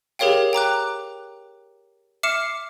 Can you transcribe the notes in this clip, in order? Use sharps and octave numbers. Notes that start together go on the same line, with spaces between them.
G4 G#4 A#4 C#5 F5 G5
G5 A#5 D6 F#6
E5 D6 F6 C7 C#7 E7